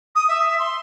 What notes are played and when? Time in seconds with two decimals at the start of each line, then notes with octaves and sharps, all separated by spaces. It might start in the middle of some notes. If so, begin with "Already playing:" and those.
0.15 D#6
0.28 E5
0.59 C6